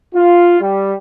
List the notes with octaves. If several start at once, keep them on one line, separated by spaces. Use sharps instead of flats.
F4
G3